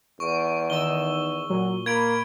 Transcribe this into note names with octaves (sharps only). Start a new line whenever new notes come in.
E2 C#6 D7
D#3 D#5 E6 G7
A#2 F#3
A#3 B5 G#6 D7